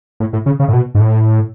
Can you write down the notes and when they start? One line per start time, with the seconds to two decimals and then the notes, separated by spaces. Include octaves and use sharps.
0.20 A2
0.33 A2
0.46 C#3
0.60 C#3
0.68 A2
0.73 B2
0.95 G#2
1.00 A2